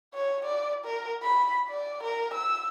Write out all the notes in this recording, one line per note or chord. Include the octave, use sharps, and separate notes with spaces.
C#5
D5
A#4
B5
D5
A#4
E6